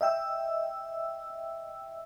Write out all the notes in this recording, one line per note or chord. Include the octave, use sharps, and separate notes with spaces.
D#5 E5 G5 E6